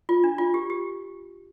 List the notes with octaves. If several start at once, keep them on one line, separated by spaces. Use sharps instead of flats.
F4
D4
F4
G4
G4